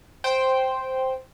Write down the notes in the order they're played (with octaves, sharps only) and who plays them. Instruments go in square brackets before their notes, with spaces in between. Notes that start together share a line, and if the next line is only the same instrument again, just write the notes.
[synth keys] C5 G5